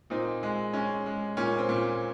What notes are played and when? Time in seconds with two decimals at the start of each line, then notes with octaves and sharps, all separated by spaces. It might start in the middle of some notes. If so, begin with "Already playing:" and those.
0.10 A#2 C4 D#4
0.43 G#3
0.73 G#3 C#4
1.06 G#3
1.37 A#2 C#4
1.58 C4
1.69 A#2